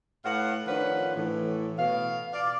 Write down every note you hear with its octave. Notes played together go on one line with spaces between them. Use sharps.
A2 B4 F5 F#5
D#3 F3 C#4 D4 B4 F#5
A2 E3
B2 F5
D5 F5